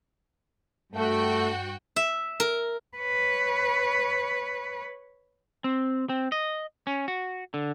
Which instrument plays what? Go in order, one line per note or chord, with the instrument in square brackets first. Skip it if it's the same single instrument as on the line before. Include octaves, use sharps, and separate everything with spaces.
[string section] G2 F#4 G5 [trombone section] A3
[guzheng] E5
A#4
[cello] B4 C#5
[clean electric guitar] C4
C4
D#5
C#4
F#4
D3